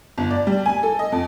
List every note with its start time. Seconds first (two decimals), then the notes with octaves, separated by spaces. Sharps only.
0.18 G1
0.31 D5
0.47 G3
0.66 G#5
0.83 A4
0.99 D#5
1.12 F2